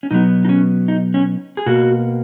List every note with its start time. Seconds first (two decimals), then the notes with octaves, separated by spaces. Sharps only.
0.03 C#4
0.11 B2 F#3 B3 D#4
0.45 D#4
0.49 C#4
0.88 D#4
1.14 C#4
1.57 G#4
1.66 B2 A#3 F#4